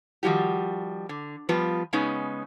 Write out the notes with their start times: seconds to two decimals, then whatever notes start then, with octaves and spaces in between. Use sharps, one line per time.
0.23 D#3 F3 G3 F#4 G4
1.09 D3
1.49 F3 G3 B3 F4 B4
1.93 C#3 G#3 B3 C#4 D#4